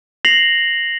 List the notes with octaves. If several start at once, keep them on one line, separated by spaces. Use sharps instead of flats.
A#6 C7 F7 F#7